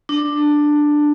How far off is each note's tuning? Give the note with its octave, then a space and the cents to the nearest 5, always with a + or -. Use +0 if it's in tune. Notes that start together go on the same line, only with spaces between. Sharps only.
D4 +10